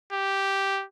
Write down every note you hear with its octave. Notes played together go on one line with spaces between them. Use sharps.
G4